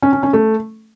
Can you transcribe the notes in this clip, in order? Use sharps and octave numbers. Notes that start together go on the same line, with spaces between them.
C#4
C#4
C#4
A3